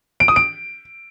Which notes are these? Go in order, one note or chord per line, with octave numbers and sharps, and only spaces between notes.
D7
D#6
D7